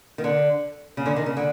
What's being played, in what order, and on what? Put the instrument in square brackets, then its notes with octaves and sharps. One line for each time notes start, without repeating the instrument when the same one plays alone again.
[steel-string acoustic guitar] D#3
D3
C#3
D3
D#3
C#3
D3